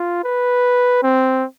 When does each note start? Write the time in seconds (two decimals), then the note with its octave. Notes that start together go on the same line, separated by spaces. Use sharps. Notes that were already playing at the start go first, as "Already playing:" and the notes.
Already playing: F4
0.24 B4
1.03 C4